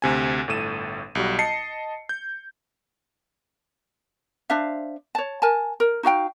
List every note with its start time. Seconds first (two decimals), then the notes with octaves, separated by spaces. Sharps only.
0.02 D2 C3 G#5
0.48 G1 A2 A4 D#7 E7
1.15 B1 G3 F#4
1.39 D#5 A5 C7 C#7
2.09 G6
4.50 D4 C5 E5 F5
5.15 C#5 A5
5.42 A#4 G#5 A5
5.80 A#4
6.03 D#4 F#4 F5 G5